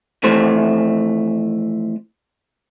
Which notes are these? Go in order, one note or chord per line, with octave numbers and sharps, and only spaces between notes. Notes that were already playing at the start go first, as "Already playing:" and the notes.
F2 E3 A3 C5